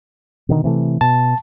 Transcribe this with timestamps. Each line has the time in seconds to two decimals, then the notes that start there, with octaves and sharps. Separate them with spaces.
0.49 B2 D3 D#3
0.64 C3 E3 A3
1.01 B2 A5